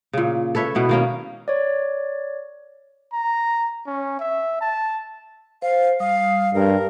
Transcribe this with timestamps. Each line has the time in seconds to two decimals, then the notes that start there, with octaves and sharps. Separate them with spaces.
0.13 A#2 C#3
0.55 A4 B4 C#5 E5
0.75 B2 B3 E4
0.89 D#3 A#3 C#4
1.48 C#5 D5
3.14 A#5
3.87 C#4
4.20 E5
4.61 A5
5.62 C5 F5
6.00 G3 F5 D#6
6.54 G2 A#4